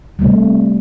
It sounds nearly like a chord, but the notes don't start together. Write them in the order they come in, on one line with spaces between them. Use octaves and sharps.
G3 A3 C3